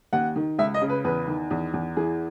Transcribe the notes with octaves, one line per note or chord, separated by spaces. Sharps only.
D#2 F#5
D#3
C#2 E5
D#5
C#3
B4
E2 B4
D#3
E2
E2
E3 G#4